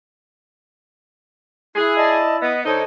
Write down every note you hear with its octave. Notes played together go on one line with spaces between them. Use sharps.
E4 G#4 F#6
D5 D#5 A5
B3 D#5
D3 D#4 A4 C5 C#5 D#5